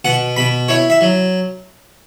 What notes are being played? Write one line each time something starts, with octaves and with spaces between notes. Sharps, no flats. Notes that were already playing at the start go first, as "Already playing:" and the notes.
B2 F#5
B2 B5
E4 C#5
E5
F#3